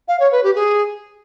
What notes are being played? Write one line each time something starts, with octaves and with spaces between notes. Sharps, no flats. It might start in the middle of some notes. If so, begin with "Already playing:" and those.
F5
C#5
B4
G4
G#4